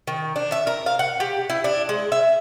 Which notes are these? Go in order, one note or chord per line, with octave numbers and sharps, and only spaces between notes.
D#3
D4
E5
A#4
F5
F#5
G4
E4
D4
G#3
E5